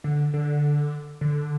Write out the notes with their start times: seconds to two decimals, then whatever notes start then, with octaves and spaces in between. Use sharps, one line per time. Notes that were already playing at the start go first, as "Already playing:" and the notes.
0.04 D3
0.34 D3
1.21 D3